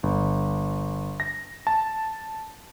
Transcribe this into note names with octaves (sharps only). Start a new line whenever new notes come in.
G1
A#6
A5